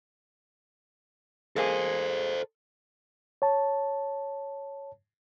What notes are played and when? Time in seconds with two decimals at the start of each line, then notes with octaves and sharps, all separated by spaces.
1.56 G#3 A#3 G#4 A4 C5
3.42 C#5 A5